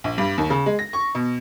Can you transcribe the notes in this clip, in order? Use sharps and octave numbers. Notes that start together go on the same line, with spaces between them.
A#1
G2
D#2
C#3
G#3
A#6
C#6
B2